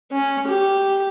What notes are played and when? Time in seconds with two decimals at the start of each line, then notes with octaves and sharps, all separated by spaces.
0.12 C#4
0.48 G4